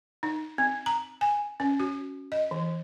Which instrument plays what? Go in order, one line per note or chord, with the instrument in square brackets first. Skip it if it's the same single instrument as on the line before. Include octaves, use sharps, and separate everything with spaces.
[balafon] D#4
C4
A#5
G#5
C#4
F#4
D#5
E3